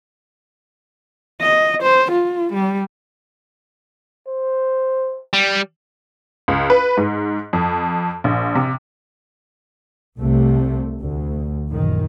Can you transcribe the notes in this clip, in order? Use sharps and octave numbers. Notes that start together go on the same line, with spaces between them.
D#5
C5
F4
G3
C5
G3
C#2
B4
G#2
F2
A#1
C3
C2 C3 A3
D2
A#1 F#2 D#3